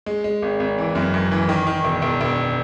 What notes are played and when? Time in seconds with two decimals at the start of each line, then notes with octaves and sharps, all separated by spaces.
0.06 G#3
0.24 G#3
0.42 G#1
0.60 G#1
0.78 E3
0.95 F#2
1.14 F#2
1.32 E3
1.49 D#3
1.67 D#3
1.84 E1
2.02 E1
2.21 E1